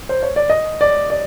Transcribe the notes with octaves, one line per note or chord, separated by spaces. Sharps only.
C5
C#5
D5
D#5
D5
D5